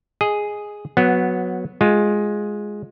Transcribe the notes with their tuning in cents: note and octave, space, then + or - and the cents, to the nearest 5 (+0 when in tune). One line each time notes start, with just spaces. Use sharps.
G#4 +0 D#5 +0
F#3 -15 B3 +0
G#3 +0 F4 +15